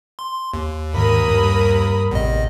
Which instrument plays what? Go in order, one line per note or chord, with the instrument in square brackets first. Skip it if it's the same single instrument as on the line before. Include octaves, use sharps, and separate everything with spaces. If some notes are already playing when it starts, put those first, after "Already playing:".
[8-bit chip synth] C6
D#2
[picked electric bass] G#2 D#3 [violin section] A#4 B5 D#6
[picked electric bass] G2
[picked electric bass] A1 C3 [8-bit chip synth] E2 D#5